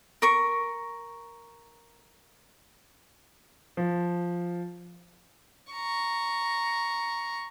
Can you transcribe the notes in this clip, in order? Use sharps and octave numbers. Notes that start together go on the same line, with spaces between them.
A#4 C#6
F3
A#5 C#6